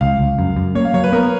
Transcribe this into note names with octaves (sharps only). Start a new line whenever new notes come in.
C#2 F5
C#2
F#2
F#2
A#3 C#5
F5
F#3 C#5
B4
B3 A#4